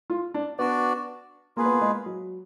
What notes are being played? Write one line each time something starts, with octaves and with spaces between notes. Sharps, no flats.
F4
D4
B3 D4 F#4 D5
A#3 F4 G#4 B4
B3
A#3
G#3
F#3